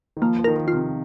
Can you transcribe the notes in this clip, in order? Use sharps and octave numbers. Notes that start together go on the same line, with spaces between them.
D#3
F3 A#3
F3
D#3 A#4
F3
F4
C3